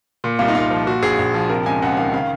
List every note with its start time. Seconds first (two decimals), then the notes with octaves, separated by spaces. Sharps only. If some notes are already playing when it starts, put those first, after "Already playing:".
0.24 A#2
0.39 C2 F4
0.48 D#4
0.55 C2 F4
0.71 F3
0.87 A#2 F#4
1.02 A#1 G#4
1.19 A#1
1.34 F3
1.50 C3 A#4
1.66 C#2 G#5
1.82 C#2 F#5
1.97 D#3 F5
2.13 C#3 F5